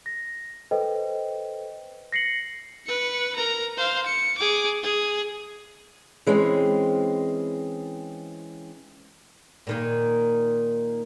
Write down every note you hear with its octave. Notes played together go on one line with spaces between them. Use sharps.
A#6
A4 B4 C5 D#5 G5
A#6 C7 C#7 F#7
B4 C#7
A#4 A#5
C5 F5
C#7
G#4 D6
G#4
E3 G#3 C4 C#4
A#2 D#3 A#3